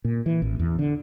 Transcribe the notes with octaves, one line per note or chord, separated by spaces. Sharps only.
A#2
E3
A1
E2
D3